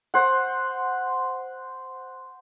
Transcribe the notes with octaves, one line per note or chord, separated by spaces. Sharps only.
C5 F#5